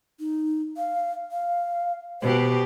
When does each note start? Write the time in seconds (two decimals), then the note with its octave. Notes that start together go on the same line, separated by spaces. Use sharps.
0.20 D#4
0.77 F5
1.32 F5
2.22 B2 G4 C5